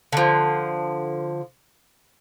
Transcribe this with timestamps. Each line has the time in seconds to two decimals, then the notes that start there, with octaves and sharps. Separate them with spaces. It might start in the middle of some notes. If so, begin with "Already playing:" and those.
0.12 D3 F3